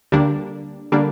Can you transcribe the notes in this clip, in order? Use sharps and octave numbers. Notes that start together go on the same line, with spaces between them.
D2 D3 G3 A#3 D4
D3 G3 A#3 D4